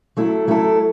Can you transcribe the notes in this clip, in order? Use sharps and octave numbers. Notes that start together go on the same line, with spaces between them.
F#3 A3 E4 A4
F#3 A3 E4 A4